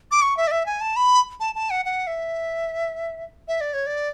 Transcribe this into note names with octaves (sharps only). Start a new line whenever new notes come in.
D6
C#6
E5
D5
E5
G#5
A5
B5
A5
A5
F#5
F#5
E5
E5
D5
C#5
D5